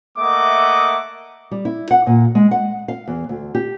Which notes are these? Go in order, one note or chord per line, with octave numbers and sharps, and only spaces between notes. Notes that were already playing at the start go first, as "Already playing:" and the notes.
A3 A#3 D#5 E5 F#5 D6
G3
E4
F#5
A#2
G#3
F#5
F5
E2
D2
G4